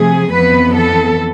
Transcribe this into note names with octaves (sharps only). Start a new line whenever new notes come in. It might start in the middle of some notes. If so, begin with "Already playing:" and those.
Already playing: C3 F3 A3 G#4
F2 E3 B3 B4
A4